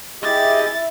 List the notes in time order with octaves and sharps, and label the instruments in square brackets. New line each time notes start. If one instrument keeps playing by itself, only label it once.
[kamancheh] E4 E5 [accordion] G4 G#4 D#5 [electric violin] A6